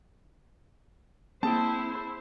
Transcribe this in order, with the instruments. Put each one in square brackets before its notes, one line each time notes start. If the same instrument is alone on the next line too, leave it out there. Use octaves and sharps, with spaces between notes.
[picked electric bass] A#3 [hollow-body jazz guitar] C4 G#4 G5 [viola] E4 C5 [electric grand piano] A5